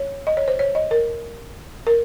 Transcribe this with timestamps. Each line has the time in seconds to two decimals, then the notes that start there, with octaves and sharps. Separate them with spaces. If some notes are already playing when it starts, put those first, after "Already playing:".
Already playing: C#5
0.27 D#5
0.37 C#5
0.48 C5
0.59 C#5
0.75 D#5
0.91 A#4
1.87 A#4